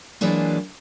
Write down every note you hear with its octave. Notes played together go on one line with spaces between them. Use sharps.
E3 F#3 G#3 A#3 D4 F4